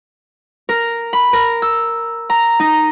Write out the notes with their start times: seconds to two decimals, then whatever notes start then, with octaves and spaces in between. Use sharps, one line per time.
0.69 A#4
1.13 B5
1.33 A#4
1.62 E6
2.30 A#5
2.60 D#4